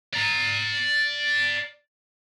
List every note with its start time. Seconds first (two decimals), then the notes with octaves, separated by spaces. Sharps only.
0.13 D5 A#5